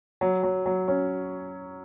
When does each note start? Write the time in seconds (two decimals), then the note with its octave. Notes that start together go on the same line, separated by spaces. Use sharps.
0.21 F#3
0.43 F#3
0.66 F#3
0.88 C#4